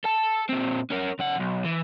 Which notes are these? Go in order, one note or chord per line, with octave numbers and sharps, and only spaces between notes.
A4 A5
A#2 C4
C#4 A#4
C#3 F#5
B1
E3